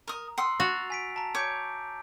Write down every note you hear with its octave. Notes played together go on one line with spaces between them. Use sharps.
A#4 A#5 D#6
F#5 C6 D#6 E6 C7
F#4 A6 F7
G#5 B6 D7
A5 A#5
C#5 D6 G6 D7